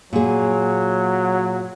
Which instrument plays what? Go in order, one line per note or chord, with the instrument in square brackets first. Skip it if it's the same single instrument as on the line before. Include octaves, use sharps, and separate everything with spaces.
[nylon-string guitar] A#2 G#4 [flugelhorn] F#3